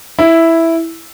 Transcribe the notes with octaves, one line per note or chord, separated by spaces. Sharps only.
E4